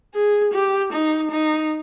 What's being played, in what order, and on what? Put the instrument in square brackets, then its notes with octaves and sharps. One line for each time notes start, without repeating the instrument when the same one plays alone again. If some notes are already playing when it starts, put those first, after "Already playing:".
[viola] G#4
G4
D#4
D#4